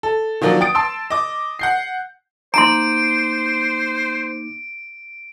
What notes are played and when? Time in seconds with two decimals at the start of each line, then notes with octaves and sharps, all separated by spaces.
0.03 A4
0.41 D#3 F3 F#3 A#3 D4
0.61 G5 D#6 A6 D7
0.75 A5 C6 E6
1.10 D#5 D6
1.59 F#5 G6 C7
2.54 A#3 D#4 C5 A#5 C6 D6 D7